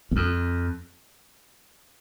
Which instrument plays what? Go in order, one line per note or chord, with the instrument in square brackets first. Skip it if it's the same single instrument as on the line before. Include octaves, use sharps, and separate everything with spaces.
[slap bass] E2
F2